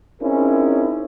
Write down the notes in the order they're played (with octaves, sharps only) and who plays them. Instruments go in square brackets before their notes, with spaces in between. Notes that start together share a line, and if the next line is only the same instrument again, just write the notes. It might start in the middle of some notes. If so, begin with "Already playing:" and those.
[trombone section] C4 C#4 D#4 E4 G#4 A#4